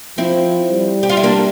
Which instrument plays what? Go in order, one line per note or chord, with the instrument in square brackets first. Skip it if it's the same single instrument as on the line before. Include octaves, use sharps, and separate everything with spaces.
[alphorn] F3 [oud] C4 E4
[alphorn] G3
[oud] G4
F4
E4
A#3 D4